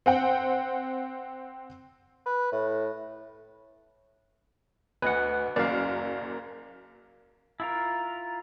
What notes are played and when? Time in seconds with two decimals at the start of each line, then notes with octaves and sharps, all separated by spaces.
0.06 C4 F#5 G5
2.26 B4
2.52 A2
5.02 D2 B4 D#5 F#5
5.56 F#1 F#2 A#3 D5 F5
7.60 E4 F4 A#4